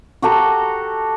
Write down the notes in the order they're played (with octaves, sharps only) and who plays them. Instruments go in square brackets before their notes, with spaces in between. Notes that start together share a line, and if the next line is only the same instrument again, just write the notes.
[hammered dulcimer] F#4 G4 A4 A#5